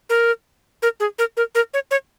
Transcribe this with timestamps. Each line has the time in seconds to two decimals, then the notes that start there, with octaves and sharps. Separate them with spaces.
0.10 A#4
0.82 A#4
1.00 G#4
1.19 A#4
1.37 A#4
1.55 A#4
1.74 C#5
1.91 C#5